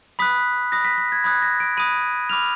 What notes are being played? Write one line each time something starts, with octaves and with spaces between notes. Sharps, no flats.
B5 D#6 F#6 B6
B5 D#6 F#6 A#6
B6
B6
G#6
B5 D#6 F#6 G#6
A#6
D7
B5 D#6 F#6 D#7
B5 D6 F6 F7